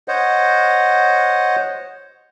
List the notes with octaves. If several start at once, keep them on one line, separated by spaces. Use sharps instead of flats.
C5 C#5 D#5 F#5